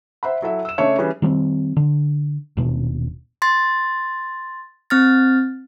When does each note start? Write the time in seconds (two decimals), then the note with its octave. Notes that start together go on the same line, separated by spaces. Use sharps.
0.23 C5 E5 F#5 B5
0.42 F#3 E4 A4 E5
0.65 E6 E7
0.78 C#3 A3 D4 C#5 D#5 E5
0.98 E3 G3 C#4 G#4
1.22 D#3 G3 A3 C4
1.77 D3
2.57 D#1 B2 D4
3.42 C6 A6
4.90 C4 F6 A6